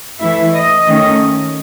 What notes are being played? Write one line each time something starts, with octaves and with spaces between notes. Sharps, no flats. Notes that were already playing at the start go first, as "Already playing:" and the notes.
E3 A3 E4 E5
D#5
D#3 A3 C#4